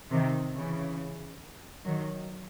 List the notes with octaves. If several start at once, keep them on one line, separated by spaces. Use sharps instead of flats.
C3 D#3
C#3 E3
D#3 F#3